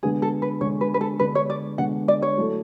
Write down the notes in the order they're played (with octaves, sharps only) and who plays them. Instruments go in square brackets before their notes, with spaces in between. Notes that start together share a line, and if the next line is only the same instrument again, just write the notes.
[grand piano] D3 G#3 B3 D4 [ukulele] G#4
[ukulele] A4
B4
[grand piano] D3 G#3 B3 D4 [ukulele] C#5
[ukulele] B4
B4
A4
[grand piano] D3 G#3 B3 D4 [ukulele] B4
[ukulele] C#5
D5
[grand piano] D3 G#3 B3 D4 [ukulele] F#5
[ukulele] D5
C#5
[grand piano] F#3 A3 E4 A4